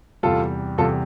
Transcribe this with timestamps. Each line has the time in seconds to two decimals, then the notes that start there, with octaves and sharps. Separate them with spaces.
0.23 E2 C3 G3 F4 A4
0.78 E2 C3 G3 F4 A4